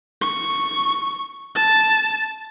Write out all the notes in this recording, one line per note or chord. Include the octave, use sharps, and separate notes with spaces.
C#6
A5